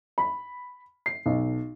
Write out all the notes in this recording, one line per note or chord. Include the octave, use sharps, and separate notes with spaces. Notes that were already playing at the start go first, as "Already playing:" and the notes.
B5
C7
B1